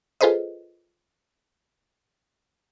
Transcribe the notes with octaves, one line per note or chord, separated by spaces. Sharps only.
F4 G#4 A4 B4 C5 D#5